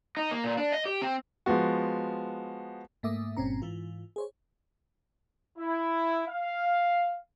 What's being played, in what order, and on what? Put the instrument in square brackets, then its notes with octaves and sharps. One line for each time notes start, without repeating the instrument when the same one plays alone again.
[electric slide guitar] D#4
A#3
A#2
D4
D#5
G4
C4
[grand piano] F3 G#3 B3 F#4
[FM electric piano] G#2 A3 A#3 E5 D6 D#6
G1 G2 A#2 C4 C#4 A#5
G#2 E3 F4
G#4 C5 C#5
[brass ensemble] E4
F5